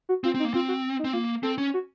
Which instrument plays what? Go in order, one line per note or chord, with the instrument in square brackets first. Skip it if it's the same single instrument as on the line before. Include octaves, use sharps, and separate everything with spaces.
[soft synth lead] F#4
[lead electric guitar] C4 [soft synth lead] F4
[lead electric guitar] C4 [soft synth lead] D#4
[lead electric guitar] A#3
[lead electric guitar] C4 [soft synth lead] F4
[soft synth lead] F#4
D#4
[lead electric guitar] C4
[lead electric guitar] A#3 [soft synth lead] F4
[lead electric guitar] C4 [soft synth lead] A4
[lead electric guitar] C#4
[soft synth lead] F#4